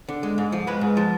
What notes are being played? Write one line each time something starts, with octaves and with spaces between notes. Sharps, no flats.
D3
G#3
G#2
F3
G#3 B4
G#2
F3